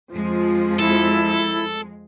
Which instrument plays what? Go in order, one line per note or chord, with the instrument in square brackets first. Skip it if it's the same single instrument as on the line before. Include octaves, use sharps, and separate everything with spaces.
[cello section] F2 G#3 [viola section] F3
[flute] E4 [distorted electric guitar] A4